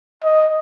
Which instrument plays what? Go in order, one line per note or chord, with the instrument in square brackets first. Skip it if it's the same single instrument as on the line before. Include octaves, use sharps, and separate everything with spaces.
[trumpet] D#5